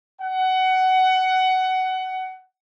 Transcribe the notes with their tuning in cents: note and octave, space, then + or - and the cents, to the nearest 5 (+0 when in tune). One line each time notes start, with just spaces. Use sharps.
F#5 +20